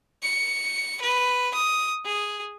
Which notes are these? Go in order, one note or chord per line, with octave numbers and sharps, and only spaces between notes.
C#7
B4
D#6
G#4